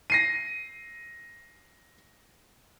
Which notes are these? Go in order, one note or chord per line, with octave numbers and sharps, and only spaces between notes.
A#6 C7 D#7